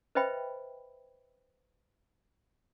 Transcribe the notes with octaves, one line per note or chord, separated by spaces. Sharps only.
B4 C5 D#5 E5 G5 B5